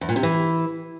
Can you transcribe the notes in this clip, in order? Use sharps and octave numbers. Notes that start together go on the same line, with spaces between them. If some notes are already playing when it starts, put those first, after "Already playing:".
E2
A#2
C3
E3